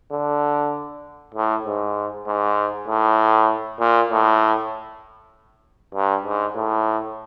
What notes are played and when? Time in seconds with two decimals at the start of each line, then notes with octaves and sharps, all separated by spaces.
0.12 D3
1.34 A2
1.65 G#2
2.27 G#2
2.88 A2
3.80 A#2
4.11 A2
5.95 G2
6.25 G#2
6.56 A2